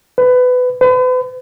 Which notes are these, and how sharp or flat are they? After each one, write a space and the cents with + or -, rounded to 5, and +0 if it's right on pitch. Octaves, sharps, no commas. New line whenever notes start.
B4 +20
B4 +40